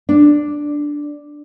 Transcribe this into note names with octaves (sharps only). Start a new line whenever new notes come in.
D4